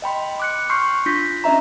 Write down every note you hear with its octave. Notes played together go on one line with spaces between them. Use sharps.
D#5 G5 B5 C6
D6 F#6 C#7
C6 C#6 F6 G6 C7
D4 F4 G6 A#6 B6
C#4 D4 D#5 E5 A#5